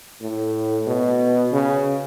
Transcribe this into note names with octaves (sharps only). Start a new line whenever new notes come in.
A2
B2
C#3